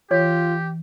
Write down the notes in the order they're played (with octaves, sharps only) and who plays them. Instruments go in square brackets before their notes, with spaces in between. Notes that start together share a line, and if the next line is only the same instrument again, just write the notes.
[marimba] E3 [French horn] F4 [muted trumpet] G4 [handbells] C#5